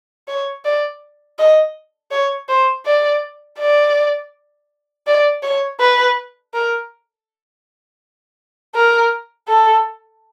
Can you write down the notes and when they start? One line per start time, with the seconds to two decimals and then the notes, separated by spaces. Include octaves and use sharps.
0.28 C#5
0.65 D5
1.39 D#5
2.11 C#5
2.49 C5
2.86 D5
3.59 D5
5.07 D5
5.43 C#5
5.80 B4
6.54 A#4
8.75 A#4
9.48 A4